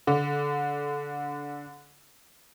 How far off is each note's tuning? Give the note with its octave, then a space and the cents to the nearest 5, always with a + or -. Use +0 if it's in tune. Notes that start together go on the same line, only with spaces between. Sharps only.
D3 -20